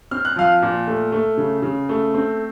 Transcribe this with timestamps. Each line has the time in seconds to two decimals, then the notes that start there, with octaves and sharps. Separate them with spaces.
0.11 C4 F6
0.25 F#6
0.36 F3 F5 F6
0.62 A#2
0.87 A3
1.12 A3
1.38 C#3
1.63 C#3
1.89 A3
2.14 C4